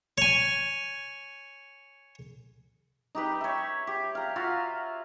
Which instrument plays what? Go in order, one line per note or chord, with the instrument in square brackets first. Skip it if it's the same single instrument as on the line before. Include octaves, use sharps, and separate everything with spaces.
[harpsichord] C#5 G#5
[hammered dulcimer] D#4 G4 B4
C#5 E5
G4
F5 A#5
F4 F#4 E5 F5